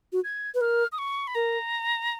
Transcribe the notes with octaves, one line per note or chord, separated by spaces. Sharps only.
F#4
G#6
B4
A#4 F6
D#6
C#6
B5
A#4 A#5